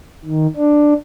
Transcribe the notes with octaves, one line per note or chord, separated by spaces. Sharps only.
D#3
D4